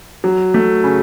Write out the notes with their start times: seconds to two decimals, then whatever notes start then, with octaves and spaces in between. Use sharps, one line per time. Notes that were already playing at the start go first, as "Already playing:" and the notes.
0.24 F#3
0.54 A3
0.84 C#3